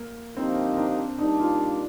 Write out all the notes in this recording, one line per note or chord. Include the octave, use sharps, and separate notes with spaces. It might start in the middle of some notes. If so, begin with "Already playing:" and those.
Already playing: A#3
D3 F3 A#3 C4 D#4 G4
D4
G3 A#3 D4 D#4
F4